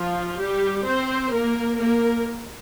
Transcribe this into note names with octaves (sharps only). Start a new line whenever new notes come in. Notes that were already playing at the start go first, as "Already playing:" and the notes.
Already playing: F3 F4
G3 G4
C4 C5
A#3 A#4
A#3 A#4